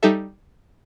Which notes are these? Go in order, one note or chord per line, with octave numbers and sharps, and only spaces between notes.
G3 D#4 A4 E5